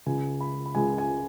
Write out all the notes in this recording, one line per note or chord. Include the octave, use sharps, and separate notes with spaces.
C#2 C#3 G#3 G#5
B5
B5
C#2 C#3 G#3 G#5
G#5